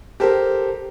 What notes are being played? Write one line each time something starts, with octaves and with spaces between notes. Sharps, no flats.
G4 A4 A#4 C5